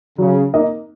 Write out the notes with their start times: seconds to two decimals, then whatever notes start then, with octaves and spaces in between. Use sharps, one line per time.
0.18 C#3 F#3
0.53 A#3 D#4 A#4 D#5